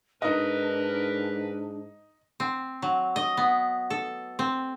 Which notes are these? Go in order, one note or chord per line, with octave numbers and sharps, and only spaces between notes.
G#2 D4 D#4 A#4 B4 D#5
C4
F#3
D#5
B3
A4
C4